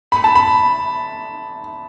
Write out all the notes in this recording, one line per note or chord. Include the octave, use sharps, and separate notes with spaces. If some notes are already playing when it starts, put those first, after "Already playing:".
B5
A5
B5